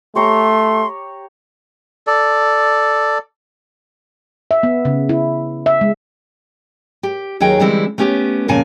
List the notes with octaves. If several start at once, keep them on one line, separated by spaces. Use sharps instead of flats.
A3 G4 C#5 A#5 C6
A4 D5
E5
B3
C#3
E4
E5
G#3
G4
D#2 F#3 D#4 G#4 G5
D3 E3 G3 G#3 C4 E4
A3 B3 C#4 G4
F2 A#2 C#3 A#3 G#5 A5